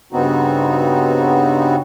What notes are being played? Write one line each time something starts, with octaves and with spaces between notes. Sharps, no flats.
G2 C#3 B3 C4 D#4 F#4